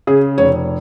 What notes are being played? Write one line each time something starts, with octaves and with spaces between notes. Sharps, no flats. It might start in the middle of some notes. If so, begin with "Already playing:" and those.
C#3 G#4
F1 C#5